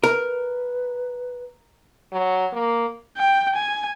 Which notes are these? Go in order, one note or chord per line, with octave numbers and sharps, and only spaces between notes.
A#4 B4
F#3
A#3
G5
G#5